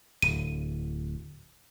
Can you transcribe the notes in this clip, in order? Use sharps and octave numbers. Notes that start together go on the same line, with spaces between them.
D1 D#7